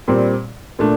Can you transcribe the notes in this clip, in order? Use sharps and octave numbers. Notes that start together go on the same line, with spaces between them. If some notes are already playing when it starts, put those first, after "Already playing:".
A#2 G3 C4
A#2 A3 D4